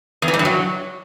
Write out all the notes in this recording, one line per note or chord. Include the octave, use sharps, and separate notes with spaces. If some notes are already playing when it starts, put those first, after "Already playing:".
E2
E3
G#2
G2
F#3